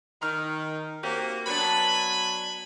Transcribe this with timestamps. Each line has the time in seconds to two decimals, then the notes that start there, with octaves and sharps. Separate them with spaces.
0.22 D#3 A#5 F6
1.03 A#3 C4 F#4 G4 C#5
1.47 F#3 B3 D4 G#5 A5 B5